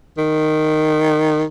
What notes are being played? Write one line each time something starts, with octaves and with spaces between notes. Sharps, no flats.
D#3